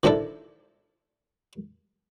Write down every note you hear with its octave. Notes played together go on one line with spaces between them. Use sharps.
D#3 F3 D4 E4 A4